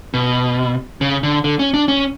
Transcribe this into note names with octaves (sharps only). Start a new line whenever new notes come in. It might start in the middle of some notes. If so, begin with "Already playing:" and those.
B2
C#3
D3
D3
C#4
D4
C#4